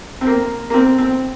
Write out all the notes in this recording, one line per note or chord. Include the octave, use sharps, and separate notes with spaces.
C4
A#3
A#3
C4
C4